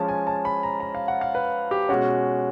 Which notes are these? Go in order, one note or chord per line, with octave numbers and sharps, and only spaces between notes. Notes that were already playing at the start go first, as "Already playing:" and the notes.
Already playing: F3 G#3 C#4 A5
G#5
A5
B5
A#5
A#5
F5
F#5
F5
B4
G4
B2 G#3 C#4 F#4